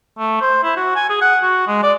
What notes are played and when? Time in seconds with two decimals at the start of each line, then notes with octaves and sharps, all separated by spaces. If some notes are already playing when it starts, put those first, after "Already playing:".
0.19 A3
0.41 C5
0.64 E4
0.77 F#4
0.95 G#5
1.10 G#4
1.21 F#5
1.43 F#4
1.67 G#3
1.83 D5